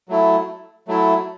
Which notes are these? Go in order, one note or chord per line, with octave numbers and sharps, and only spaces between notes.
F#3 A3 E4
F#3 A3 E4